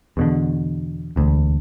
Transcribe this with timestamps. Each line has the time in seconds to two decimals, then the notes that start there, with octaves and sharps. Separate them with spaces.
0.17 E2 B2 D3
1.16 E1 D2